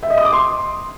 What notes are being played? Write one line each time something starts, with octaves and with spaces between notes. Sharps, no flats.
E5
D#5
D#6
D6
C6